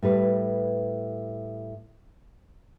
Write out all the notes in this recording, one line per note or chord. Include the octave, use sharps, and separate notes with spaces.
A2 G3 B4